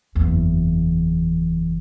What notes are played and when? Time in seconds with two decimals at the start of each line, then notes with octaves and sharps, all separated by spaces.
0.15 F#1 E2